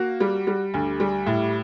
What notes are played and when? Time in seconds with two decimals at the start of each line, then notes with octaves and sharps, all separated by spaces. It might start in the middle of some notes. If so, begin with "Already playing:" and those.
Already playing: A#3 F#4
0.20 G3
0.47 G3
0.74 D2
1.00 G3
1.26 A2